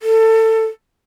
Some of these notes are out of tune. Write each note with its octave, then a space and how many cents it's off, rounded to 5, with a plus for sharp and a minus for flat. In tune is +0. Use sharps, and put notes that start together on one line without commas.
A4 +20